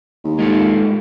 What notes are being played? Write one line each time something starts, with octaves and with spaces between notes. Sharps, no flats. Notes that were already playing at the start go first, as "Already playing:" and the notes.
D#2
G#3 F4 A4